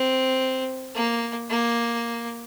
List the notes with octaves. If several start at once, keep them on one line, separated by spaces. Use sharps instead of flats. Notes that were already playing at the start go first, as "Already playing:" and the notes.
Already playing: C4
A#3
A#3